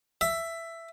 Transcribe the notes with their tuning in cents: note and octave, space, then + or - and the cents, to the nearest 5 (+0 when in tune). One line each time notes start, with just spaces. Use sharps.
E5 +10